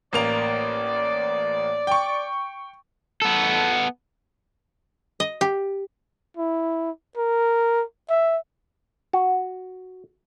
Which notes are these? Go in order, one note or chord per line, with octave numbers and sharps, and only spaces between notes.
A1 A#3 D5 F7
G5 C#6
B3 A4
D#5
G4
E4
A#4
E5
F#4